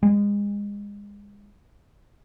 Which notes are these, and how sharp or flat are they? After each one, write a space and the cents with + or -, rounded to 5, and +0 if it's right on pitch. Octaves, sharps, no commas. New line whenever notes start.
G#3 -30